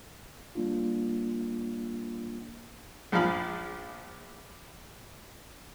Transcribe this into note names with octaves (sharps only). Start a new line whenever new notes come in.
G3 A#3 D4 F4
A#1 F3 G#4 F5 B5